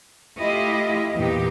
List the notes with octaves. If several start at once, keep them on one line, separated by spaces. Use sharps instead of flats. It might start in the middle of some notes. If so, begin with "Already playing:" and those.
A3 E4 F4 G4 D#5
E2 A#2 D#4 G4